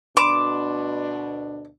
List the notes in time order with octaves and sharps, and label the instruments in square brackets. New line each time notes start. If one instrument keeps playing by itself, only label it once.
[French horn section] D2 B2 D4 [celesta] B5 C6 E7 [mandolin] D6